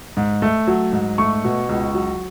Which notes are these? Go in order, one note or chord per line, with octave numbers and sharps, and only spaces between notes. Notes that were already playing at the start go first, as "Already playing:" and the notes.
G#2
A3
F#3
G#2
A3 C#6
B2
C#2
F#3